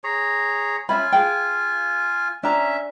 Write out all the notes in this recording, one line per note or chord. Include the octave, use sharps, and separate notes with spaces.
G#4 C#5 A#5
C#4 F4 E5 G#5 B5
G#4 F5 G5
C#4 D4 E5 A#5